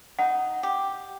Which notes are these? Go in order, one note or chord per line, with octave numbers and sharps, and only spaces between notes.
D#4 F#5
G4